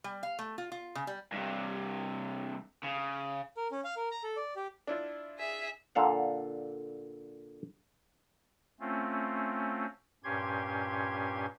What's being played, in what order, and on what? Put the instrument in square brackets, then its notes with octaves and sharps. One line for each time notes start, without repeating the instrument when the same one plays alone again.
[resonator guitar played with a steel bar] G3
F5
A3
F4
F4
C#3
G3
[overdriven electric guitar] G2 C3
C#3
[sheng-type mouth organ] A#4
C#4
F5
A#4
A#5
A4
D5
G4
[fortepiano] D4 E4 F4
[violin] G#4 E5
[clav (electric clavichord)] A#2 D3 A4 F5 F#5
[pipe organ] A3 C4 C#4 F4
G2 A#2 C#4 G4 C6 G#6